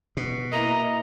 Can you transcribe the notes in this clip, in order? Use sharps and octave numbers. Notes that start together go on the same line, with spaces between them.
B2
A#3 E4 D#5 A#5